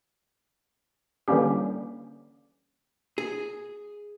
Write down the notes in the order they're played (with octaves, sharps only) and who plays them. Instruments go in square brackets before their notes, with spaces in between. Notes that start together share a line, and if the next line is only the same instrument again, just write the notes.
[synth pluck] D3 E3 G3 A#3 C#4 G4
[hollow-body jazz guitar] G#4